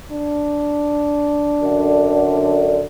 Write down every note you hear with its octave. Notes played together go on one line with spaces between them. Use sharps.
D4
F#2 D3